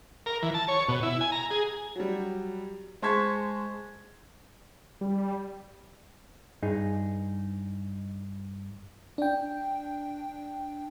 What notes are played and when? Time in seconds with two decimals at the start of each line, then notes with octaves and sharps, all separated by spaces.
0.26 A#4
0.43 E3
0.54 A5
0.68 C#5
0.89 B2
1.03 E4
1.21 G#5
1.32 A#5
1.51 G#4
1.95 F#3 G3
3.02 G#3 C5 A5 C#6 G#6 B6
5.01 G3
6.62 G2 D#4 G#4
9.18 D4 G5